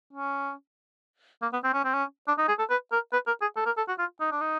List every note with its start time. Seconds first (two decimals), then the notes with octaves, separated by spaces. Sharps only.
0.13 C#4
1.42 A#3
1.53 B3
1.64 C4
1.73 C#4
1.85 C4
1.94 C#4
2.28 D4
2.38 D#4
2.48 G#4
2.59 A4
2.70 B4
2.92 A#4
3.13 B4
3.27 A#4
3.41 G#4
3.56 A4
3.66 A#4
3.78 A4
3.88 F#4
3.99 F4
4.20 D#4
4.32 D4
4.41 D#4